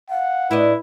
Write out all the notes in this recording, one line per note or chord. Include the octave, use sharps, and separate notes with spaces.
F5 F#5
A2 D4 E4 B4 D#5